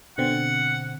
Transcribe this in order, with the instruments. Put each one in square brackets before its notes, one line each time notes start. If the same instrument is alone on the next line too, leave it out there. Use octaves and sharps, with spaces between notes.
[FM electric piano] B2 D3 C4 [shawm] F#5